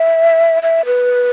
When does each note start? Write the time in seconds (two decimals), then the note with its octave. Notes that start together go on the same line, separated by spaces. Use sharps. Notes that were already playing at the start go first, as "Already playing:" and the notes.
Already playing: E5
0.63 E5
0.86 B4